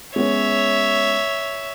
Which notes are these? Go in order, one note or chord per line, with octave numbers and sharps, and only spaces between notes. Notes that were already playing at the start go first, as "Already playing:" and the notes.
G#3 B3 C#4 C#5 E5